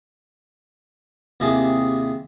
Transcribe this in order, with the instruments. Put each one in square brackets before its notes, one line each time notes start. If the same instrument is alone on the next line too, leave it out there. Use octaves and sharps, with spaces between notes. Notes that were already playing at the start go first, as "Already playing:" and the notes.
[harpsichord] D#2 C3 E4 G#4 A5